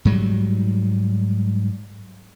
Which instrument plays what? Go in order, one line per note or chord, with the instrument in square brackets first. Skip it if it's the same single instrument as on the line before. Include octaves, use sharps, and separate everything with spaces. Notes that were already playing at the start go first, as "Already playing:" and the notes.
[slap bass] G#2 F#3 G3